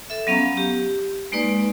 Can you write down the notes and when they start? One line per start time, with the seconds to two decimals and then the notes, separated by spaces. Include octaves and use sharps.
0.10 A4 E5
0.27 F#3 B3 C#4 F5 A#5
0.57 G4
1.32 G#3 A#3 D#4 B4 D5